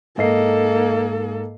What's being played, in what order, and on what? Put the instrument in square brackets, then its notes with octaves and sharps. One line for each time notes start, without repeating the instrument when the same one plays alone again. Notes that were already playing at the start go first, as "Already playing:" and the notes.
[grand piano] G#2 D#5 C7 [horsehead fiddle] A#3 A4